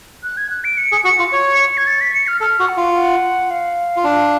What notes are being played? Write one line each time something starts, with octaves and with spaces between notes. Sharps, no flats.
F#6
G#6
F#6
D7
C#7
G#4
F#4 C#7
F4
C#5
G#6
A6
B6
C#7
F6
A4 F6
F#4
F#5
F4
F#5
F5
F4
D4